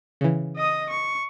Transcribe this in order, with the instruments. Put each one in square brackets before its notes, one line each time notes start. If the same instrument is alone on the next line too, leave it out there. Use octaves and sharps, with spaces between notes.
[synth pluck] C#3 E3
[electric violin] D#5 D#6
C#6